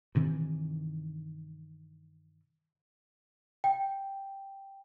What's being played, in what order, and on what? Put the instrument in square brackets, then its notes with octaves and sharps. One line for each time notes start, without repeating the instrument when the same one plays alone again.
[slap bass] G2 C3 D#3 E3
[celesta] G5